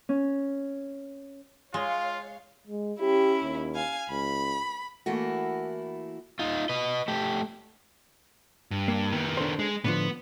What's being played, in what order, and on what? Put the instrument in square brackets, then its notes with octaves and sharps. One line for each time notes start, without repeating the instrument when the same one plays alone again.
[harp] C#4
[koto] G#3 [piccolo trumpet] F4 [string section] C#5 F5
[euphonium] G#3
[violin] C#4 E4 [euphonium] G4
[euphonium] D#2
[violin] F5 G#5
[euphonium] C#2 [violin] B5
[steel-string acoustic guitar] E3 A3 A#3 E4 F#4
[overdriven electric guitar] D#4 F4
B4 D#5
A3 G4
[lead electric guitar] G2
[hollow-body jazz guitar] A#3
[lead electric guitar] D#3 B3
[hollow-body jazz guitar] D4 A4 C5
[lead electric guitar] G#3
[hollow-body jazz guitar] A2 D3 F3 [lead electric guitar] B3